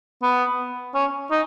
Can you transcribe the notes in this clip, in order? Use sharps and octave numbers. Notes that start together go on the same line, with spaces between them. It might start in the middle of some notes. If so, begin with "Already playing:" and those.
B3
C#4
D#4